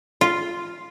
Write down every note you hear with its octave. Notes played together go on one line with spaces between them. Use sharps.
F4